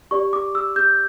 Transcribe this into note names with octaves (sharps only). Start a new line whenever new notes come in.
G4 D5 C#6
D6
E6
G6